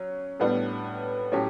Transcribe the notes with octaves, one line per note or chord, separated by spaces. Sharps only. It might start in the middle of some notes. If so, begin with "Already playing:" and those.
Already playing: F#3 C#4
A2 G3 B3 D4
A2 F#3 C#4 G4